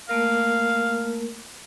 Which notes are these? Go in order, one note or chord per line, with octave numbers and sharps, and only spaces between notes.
A3 A#3 A#4 F5